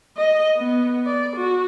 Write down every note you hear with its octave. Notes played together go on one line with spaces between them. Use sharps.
D#5
B3
D5
F#4